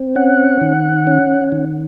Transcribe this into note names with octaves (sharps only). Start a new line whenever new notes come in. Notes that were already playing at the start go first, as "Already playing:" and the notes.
Already playing: C4
C#4 F#5
D#3
C#4
D#3